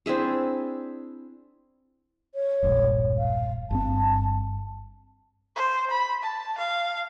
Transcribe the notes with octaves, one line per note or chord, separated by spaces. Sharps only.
C4 D4 E4 G#4
C#5
E1 A#1 G2
F5
G1 G2 C4 A5
C5
B5
A5
F5